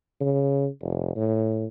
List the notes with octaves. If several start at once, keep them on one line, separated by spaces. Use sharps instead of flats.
C#3
F1
A2